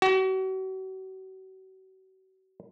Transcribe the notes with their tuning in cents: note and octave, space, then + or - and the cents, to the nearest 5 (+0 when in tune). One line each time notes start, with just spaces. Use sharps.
F#4 +40